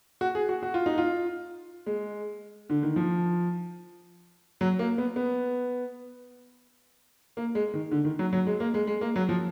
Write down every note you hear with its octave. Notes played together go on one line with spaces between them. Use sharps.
F#4
G#4
F#4
F#4
F4
D#4
F4
G#3
D3
D#3
F3
F#3
A#3
B3
B3
A#3
G#3
D#3
D3
D#3
F#3
F#3
G#3
A#3
G#3
G#3
A#3
F#3
F3